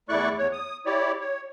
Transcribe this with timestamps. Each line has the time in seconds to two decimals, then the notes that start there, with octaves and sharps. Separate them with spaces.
0.09 E2 A3 E4 D5 C#6 F#6
0.38 E2 C#5
0.53 D#6
0.86 E4 G4 C#5 D5
1.20 C#5